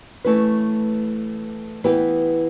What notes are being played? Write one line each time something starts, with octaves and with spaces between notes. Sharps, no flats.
E3 A3 C#4 E4 B4
E3 B3 E4 G4 B4